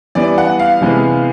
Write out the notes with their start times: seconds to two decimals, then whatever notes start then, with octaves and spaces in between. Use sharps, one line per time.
0.15 E3 G3 B3 D5
0.38 F#5
0.59 F5
0.81 C3 E3 G#3 B3